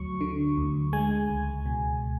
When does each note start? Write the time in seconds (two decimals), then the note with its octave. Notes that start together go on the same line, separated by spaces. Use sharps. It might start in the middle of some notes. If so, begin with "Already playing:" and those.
Already playing: D2 F#3 C#6
0.21 D3
0.58 D2
0.93 G#3 G#5
1.30 C#2
1.66 B2